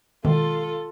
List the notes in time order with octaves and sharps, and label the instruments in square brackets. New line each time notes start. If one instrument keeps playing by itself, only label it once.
[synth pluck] B2 D#3 G#3 [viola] F4 A4